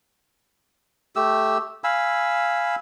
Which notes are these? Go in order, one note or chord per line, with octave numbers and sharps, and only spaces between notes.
A3 G4 E6
F5 G#5 B5 E6